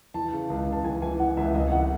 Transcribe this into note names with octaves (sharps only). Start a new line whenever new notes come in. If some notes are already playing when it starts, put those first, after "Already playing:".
E3 A5
C#3
C#2
C#2 A5
E3 G#5
E3 G#5
E3 F#5
C#2 E5
C2 D#5
C2 F#5